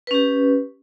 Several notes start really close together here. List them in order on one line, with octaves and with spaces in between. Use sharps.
B4 C#4 G4